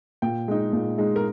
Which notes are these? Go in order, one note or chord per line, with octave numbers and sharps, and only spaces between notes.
A#2 G5
G#3 D#4
A#2
G#3 D#4
A#4